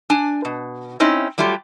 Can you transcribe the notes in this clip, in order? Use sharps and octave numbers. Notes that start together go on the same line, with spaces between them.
D4 G#5
B2
C4 C#4 D#4 E4
F#3 G3 A3 F4 G4